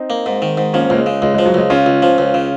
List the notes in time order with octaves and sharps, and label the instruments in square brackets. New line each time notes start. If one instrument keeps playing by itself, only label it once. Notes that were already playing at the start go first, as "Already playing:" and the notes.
Already playing: [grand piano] C4 D#4
[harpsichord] A#3
G#2
D#3
G#2
[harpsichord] F3 [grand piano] A#3 C#4
[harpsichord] C#2 [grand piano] A#3
[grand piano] G#3
[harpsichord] C#3
[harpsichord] C#2 [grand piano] G#3
[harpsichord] F3 [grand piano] G#3
[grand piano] F#3
[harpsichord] C#2 [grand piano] G#3
[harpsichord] C#3 [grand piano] C#4 F4
[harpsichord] C#2
F3
C#2
C#3